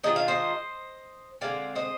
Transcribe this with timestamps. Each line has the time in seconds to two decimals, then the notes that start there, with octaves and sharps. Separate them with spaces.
0.04 D#3 G#3 D4 F4 D#5
0.16 F5
0.28 C5 D#5
1.41 D3 G#3 C4 D5 F5
1.75 C5 D#5